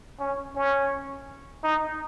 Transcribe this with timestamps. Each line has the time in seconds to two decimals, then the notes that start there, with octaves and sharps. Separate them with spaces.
0.20 C#4
0.56 C#4
1.64 D#4